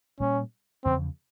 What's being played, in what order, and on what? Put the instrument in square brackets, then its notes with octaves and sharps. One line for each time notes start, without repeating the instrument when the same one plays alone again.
[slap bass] A#2 G3 A#3 [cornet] C#4
[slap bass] E2 C#3 F3 [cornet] C4